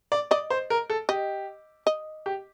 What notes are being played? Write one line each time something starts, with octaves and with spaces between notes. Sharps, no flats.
D5
D5 D#5
C5
A#4
A4
G4 D#5
D#5
G4